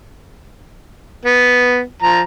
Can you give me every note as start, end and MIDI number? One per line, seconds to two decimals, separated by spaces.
1.25 1.81 59
2.02 2.21 53
2.02 2.21 82